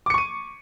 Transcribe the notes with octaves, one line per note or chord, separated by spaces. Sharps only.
C#6 D6 C#7 D#7